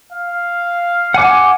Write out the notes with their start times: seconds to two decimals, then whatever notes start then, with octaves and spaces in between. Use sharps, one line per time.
0.13 F5
1.14 F#5 G#5 D6